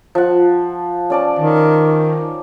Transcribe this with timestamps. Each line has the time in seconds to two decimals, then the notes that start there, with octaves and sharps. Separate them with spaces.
0.15 F3 F#5
1.10 C#4 D5 A5
1.39 D#3